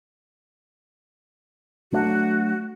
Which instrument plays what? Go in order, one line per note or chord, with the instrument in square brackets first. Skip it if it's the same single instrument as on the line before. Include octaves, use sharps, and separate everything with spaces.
[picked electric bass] F#3 A3 D4 [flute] F#4